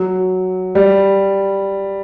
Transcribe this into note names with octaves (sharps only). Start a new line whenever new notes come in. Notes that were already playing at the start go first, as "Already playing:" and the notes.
Already playing: F#3
G3